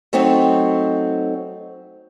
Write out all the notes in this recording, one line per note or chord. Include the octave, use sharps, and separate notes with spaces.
F#3 A3 C4 D#4 C#5